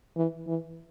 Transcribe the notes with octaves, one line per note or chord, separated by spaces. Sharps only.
E3
E3